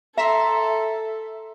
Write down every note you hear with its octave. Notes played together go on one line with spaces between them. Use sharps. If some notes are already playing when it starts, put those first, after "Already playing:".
A4 E5 A#5 C6